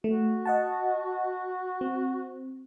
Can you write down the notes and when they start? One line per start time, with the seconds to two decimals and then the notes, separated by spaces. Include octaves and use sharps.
0.04 A3 F#4
0.45 D#5 F#5 A5
1.81 C4